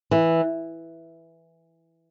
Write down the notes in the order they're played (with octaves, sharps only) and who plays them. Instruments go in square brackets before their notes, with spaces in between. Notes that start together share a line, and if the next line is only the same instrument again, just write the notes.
[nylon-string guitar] E3